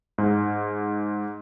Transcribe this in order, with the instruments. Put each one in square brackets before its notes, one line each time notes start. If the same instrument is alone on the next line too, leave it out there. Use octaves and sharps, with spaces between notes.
[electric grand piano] G#2